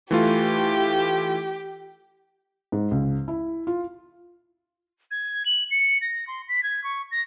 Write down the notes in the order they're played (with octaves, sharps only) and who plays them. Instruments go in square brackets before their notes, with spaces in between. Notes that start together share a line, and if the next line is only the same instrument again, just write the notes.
[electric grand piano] E3 A3 F4 [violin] G4
[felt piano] G#2
C#2
E4
F4
[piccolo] G#6
F#7
C#7
A#6
C6
B6
G#6
C#6
A#6